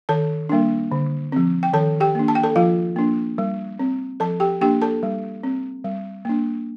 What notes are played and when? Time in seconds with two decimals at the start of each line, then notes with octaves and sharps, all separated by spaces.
0.09 D#3 A4 A5
0.49 G3 A#3 D4
0.92 D3
1.32 F3 C4
1.63 G5
1.73 D#3 A4 A5
2.00 G4 G5
2.15 A#3 D4
2.28 A5
2.35 G5
2.44 A4 A5
2.56 F3 F4 F5
2.96 A#3 D4
3.38 G3
3.79 C4
4.20 F3 A4 A5
4.40 G4 G5
4.61 A#3 D4 G4 G5
4.82 A4 A5
5.03 G3
5.43 C4
5.85 G3
6.25 A#3 D4